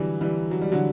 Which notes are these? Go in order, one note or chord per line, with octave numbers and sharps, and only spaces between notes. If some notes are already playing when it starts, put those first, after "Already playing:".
Already playing: D3 E3 F#3 G3
E3 G3
F#3
G3
D3 F#3